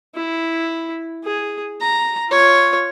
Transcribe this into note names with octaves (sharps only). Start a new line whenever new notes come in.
E4
G#4
A#5
F4 C#5